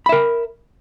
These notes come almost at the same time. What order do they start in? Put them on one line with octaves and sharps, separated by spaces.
B5 E5 A#4